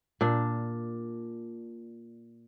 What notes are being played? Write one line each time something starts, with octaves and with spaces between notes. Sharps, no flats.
A#2 D4